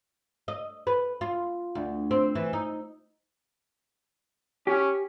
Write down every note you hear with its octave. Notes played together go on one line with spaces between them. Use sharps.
D#5
B4
F4
D2
C4
E3
D#4
C#4 G4